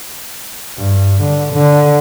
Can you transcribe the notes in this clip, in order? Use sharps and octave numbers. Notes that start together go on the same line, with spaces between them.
G2
D3
D3